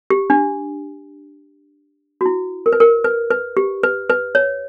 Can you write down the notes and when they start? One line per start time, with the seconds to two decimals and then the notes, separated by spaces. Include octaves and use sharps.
0.10 G4
0.30 D4
2.21 F#4
2.26 E4
2.66 A#4
2.72 B4
2.80 A#4
3.04 B4
3.31 B4
3.57 G4
3.83 B4
4.10 B4
4.35 C#5